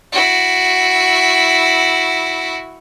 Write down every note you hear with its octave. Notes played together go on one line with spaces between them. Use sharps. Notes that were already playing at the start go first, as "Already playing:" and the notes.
E4 F#4